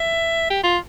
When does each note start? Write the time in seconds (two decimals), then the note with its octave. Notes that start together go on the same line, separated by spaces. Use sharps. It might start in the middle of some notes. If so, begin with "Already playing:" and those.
Already playing: E5
0.50 G4
0.64 F4